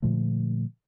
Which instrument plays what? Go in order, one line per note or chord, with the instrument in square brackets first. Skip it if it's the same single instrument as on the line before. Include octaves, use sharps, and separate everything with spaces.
[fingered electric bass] A#2 D3 F3 A3